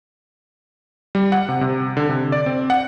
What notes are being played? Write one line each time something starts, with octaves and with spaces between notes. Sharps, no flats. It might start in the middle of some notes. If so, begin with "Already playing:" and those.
G3
F#5
C3
C3
D3
C3
D5
C4
F#5